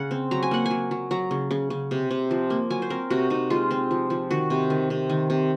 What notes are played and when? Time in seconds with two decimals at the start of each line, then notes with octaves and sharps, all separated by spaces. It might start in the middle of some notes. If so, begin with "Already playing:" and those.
Already playing: C#3 F#5
0.11 C4
0.31 F#3 A#5
0.43 G#5
0.51 A#3 F#5
0.66 G#5
0.71 F#3
0.91 F#3
1.11 F#3 A#5
1.31 C#3
1.51 C#3
1.70 C#3
1.91 C3
2.11 C3
2.31 F3
2.50 A#3
2.70 F#3 G#5
2.82 C5
2.90 C4 A#4
3.10 C3 F#4
3.30 C3 D#4
3.50 G#3 F4
3.71 C4
3.91 F3
4.10 F3
4.31 D#3 F#4
4.50 C3
4.70 D#3
4.90 C3
5.09 D#3
5.30 C3